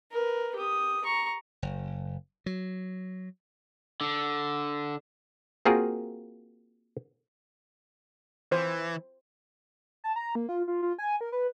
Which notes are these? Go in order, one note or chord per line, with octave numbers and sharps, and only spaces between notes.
A#4 B4
G4 D#6
A#5 C#6
F#1
F#3
D3
A#3 C4 F4 F#4 G#4 A#4
E3 C5
A5
A#5
A#3
F4
F4
F4
G#5
A#4
B4